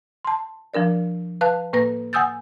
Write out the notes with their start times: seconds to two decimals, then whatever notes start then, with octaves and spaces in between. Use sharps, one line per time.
0.25 A5 C6
0.74 F3 D4 A#4 D5
1.41 B4 F5 A5 F#6
1.73 A2 A#3 B4 A#6
2.13 F#5 G#5 D#6 E6 G6 A6